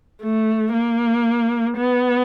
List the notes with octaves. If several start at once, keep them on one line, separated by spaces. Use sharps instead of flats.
A3
A#3
B3